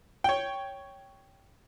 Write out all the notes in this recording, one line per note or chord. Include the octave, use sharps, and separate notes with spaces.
C#5 G5